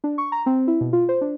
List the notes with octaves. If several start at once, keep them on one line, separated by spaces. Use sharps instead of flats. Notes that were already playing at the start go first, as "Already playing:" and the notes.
D4
C#6
A#5
C4
E4
B2
F4
C5
D4